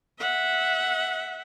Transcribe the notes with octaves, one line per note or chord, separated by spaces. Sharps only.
E5 F#5